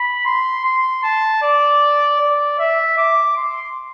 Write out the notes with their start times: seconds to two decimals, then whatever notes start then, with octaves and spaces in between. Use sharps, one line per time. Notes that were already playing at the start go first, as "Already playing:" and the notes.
Already playing: B5
0.26 C6
0.65 C6
1.04 A5
1.43 D5
2.21 D5
2.59 E5
2.97 D6
3.37 C6